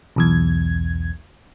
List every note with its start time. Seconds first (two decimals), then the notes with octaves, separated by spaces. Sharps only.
0.16 B1 E2 G#6